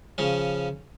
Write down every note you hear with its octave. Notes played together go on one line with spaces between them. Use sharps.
C#3 F3 C#4